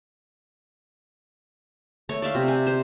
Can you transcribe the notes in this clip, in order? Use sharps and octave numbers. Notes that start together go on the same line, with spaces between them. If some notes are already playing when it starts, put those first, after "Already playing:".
A3 C#5
D5 E5 F5 C6
C3
G#5
C5